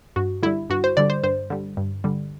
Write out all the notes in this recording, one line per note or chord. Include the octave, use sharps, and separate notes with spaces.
G2 F#4
D3 G3 E4
G2 F#4
C5
D3 G3 D5
C5
G2 C5
D3 G3
G2
D3 G3